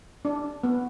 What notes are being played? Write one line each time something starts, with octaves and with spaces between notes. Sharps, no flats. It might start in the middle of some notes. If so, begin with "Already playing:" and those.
D4
B3